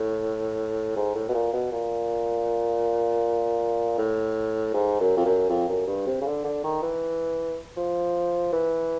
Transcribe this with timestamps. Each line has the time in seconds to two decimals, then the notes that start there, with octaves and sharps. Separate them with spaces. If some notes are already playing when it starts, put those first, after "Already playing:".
Already playing: A2
0.96 G#2
1.15 A2
1.29 B2
1.34 A#2
1.53 B2
1.72 A#2
3.98 A2
4.74 G#2
5.00 F#2
5.16 F2
5.25 F#2
5.49 F2
5.69 F#2
5.87 G2
6.07 C3
6.21 C#3
6.26 D3
6.44 D3
6.64 D#3
6.82 E3
7.77 F3
8.53 E3